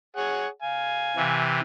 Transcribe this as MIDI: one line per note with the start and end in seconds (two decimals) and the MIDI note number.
0.17 0.47 68
0.17 0.47 73
0.17 0.47 78
0.63 1.42 77
0.63 1.42 80
1.16 1.60 48
1.16 1.60 52